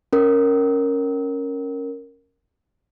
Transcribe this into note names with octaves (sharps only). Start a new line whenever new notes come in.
C#4 A#4